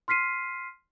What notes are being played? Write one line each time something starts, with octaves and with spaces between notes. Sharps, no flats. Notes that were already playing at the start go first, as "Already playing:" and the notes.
C6 F6 B6 C7 D#7